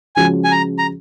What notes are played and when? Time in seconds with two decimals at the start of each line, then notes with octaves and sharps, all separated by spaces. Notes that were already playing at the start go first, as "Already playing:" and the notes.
0.16 C#3 F3 G#3 C#4 F#4 G#5
0.44 G#5
0.52 A#5
0.78 A#5